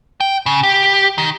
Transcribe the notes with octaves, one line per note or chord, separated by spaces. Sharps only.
G5
C#3
G4
D#3